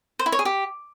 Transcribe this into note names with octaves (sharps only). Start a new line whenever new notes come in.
C5
E4
C#5
G#4
G4